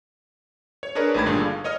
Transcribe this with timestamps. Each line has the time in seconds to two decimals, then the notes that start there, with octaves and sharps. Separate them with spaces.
0.83 C#5
0.95 D4 G#4 A#4 B4 C#5 D5
1.14 G#1 D#3 A3 B5 G#6
1.26 G2 A#2 D3 G#4
1.45 F5
1.64 C#5 D#5 D#6 F6